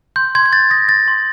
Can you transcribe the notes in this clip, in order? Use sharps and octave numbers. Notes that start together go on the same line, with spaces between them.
C6 G6
C6 G#6
G#6
G6 A6
D#6 A#6
C6 A6
C6